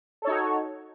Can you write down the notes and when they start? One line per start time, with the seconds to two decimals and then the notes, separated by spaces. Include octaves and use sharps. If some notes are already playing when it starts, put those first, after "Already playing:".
0.22 A4
0.25 C#5
0.27 D#4
0.30 F#4